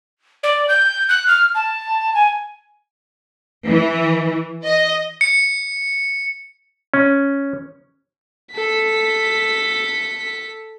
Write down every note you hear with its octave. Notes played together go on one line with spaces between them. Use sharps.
D5
G6
F#6
F6
A5
G#5
E3
D#5
C#7
C#4
A4 B6